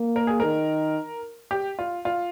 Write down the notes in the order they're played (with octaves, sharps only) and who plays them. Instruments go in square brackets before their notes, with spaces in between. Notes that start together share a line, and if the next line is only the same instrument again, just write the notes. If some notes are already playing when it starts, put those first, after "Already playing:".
Already playing: [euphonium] A#3
[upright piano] A#4
G#4
[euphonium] D#3 [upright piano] A#4
[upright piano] G4
F4
F4